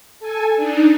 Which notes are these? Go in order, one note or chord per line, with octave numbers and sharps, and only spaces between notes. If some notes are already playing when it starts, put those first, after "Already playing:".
A4 G#5
D4 D#4